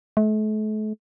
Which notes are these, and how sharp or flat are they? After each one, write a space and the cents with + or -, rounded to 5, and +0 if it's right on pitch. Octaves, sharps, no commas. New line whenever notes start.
A3 -40